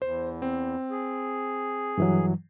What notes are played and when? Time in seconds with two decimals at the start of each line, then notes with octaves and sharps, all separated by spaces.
0.02 E2 C5
0.42 C4
0.91 G#4
1.98 G2 E3 F#3